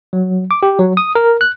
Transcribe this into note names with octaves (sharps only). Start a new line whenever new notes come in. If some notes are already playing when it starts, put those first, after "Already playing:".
F#3
D6
G4
F#3
D#6
A#4
F#6